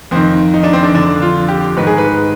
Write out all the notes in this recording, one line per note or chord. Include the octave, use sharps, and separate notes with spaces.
F2 D#3 C4
D#4
D4
C4
D4
F2 D3 D4
F4
G4
G#2 D#3 B4
G#4
B4